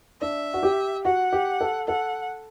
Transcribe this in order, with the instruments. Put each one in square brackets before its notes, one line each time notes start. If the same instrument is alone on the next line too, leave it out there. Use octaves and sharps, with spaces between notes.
[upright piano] D4 [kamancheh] E5
[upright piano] F#4
G4
[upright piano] F#4 [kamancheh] F#5
[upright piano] G4
A4
[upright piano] A4 [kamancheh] F#5